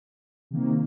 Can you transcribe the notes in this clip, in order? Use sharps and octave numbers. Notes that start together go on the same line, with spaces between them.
C3 D#3 A#3